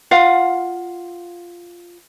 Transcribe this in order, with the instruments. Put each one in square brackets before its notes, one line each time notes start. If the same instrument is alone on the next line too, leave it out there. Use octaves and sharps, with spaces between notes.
[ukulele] F4 F5 F#5